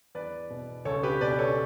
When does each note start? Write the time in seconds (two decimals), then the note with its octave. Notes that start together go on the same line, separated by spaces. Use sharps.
0.15 E2 B4 D5
0.50 B2
0.85 C#2 A4 C#5
1.03 G4 B4
1.21 B2 B4 D5
1.39 A4 C#5